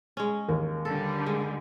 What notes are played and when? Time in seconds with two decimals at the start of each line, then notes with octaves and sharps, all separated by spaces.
0.17 G#3 C#4
0.48 D#2 A#4
0.85 D3 G3 A4
1.26 G#3